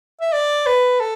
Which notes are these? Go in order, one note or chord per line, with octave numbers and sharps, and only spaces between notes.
E5
D5
B4
A4